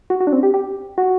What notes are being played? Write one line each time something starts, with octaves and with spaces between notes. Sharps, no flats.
F#4
F#4
D4
C4
G4
G4
F#4